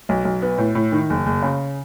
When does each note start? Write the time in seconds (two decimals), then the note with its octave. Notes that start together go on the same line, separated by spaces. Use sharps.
0.09 B1
0.25 B1
0.42 B3
0.58 A2
0.75 A2
0.92 D#3
1.10 F#1
1.26 F#1
1.42 C#3